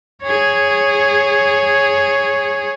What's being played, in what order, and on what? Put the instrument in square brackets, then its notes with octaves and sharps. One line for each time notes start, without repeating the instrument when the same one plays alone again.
[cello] G#4 C#5